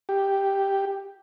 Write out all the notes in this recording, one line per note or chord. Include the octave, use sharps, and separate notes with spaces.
G4